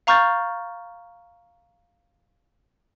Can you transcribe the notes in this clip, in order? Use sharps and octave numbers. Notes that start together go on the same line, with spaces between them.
F5 A#5 C#6 F6 G6 A6